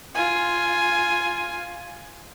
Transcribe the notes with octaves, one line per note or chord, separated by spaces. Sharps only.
F4 G#5